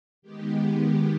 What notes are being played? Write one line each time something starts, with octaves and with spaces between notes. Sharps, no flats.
D#3 G#3 B3 G4